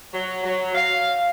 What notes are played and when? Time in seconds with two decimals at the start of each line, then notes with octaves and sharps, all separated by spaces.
0.12 F#3
0.43 F#3
0.74 F5